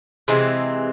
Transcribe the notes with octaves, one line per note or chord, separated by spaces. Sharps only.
C3 E3 G#3 C4